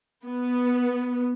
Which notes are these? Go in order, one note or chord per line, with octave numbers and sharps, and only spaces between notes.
B3